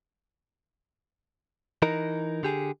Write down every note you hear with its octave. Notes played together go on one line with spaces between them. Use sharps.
E3 D#4 A#4
D3 G4 G#4